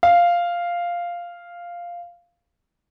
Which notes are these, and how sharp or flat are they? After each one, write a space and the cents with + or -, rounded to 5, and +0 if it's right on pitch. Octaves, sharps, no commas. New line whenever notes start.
F5 -5